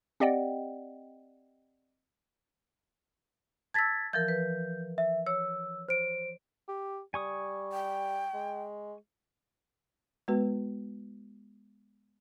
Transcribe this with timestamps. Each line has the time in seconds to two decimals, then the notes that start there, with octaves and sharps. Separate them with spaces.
0.20 C4 G4 D5 D#5 F#5 G5
3.74 A5 E6 G#6 A6 B6
4.13 E3 F3 A#4 G6
4.28 B4
4.98 E5
5.27 C#5 E6
5.89 C5 D7
6.68 G4
7.14 G3 G#5 C#6 D#6
7.73 G5
8.34 G#3
10.28 G#3 B3 F#4 B4